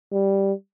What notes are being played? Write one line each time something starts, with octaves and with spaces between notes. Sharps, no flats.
G3